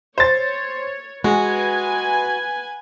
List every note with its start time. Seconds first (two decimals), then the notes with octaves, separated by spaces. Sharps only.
0.18 C5 C#5 A6
1.24 G#3 F#4 B4 G#5